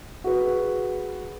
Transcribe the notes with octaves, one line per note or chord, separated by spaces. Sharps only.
F#4 G#4 B4